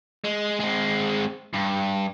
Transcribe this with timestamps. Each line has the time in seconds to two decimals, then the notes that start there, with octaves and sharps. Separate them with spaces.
0.24 G#3
0.60 G#3 C4
1.54 G2